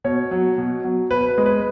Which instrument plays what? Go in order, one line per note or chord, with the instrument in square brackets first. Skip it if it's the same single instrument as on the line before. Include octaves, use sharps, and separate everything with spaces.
[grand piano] B2 C#5
F#3
B2
F#3
B2 B4
B4
G#3
B4